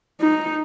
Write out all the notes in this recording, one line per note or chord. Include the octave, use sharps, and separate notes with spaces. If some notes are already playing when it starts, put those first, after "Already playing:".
D#4